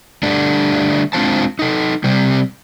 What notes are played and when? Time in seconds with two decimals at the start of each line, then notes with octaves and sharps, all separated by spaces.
0.23 D3 G3 A3 D4
1.13 G#3 C4 D4 F4 C5 A5
1.59 D#4 A4
2.04 C3 G3 C4